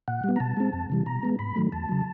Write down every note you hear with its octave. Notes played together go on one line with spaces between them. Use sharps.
A#2 F#5
G3
B3
A#5
B2 A5
G#3 C4
F2
C3 E3 G3
B2 A#5
G#3 B3
G#2 B5
D#3 F#3 A3
E2 A5
C#3 F#3